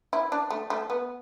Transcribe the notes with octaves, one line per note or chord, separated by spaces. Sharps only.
E4
D4
A3
A3
B3